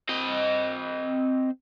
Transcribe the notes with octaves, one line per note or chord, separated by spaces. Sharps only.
C4 D#5